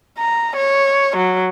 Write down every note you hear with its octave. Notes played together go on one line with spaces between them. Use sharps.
A#5
C#5
F#3